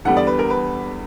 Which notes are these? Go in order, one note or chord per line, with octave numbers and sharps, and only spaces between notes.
E2 D3 G3 B3 F#5
D5
B4
A#4
B4